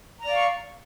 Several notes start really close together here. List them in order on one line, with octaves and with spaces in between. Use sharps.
A#5 D5 F5 C#6